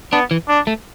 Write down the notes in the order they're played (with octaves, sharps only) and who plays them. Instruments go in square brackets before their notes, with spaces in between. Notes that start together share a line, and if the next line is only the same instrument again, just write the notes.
[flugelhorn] B3 [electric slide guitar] D4
[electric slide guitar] E3
[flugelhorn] D4
[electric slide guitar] A3